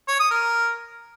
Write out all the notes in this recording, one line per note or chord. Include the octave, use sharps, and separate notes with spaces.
C#5
D#6
A#4